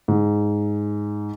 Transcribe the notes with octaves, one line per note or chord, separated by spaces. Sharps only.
G#2